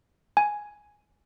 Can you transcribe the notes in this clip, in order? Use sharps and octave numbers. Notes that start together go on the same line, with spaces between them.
G#5